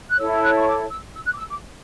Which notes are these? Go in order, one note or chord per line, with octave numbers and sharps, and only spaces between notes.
F#6
E4 A4 C#5 E6
F#6
C#6
D6
E6
E6
F#6
D6
E6
D6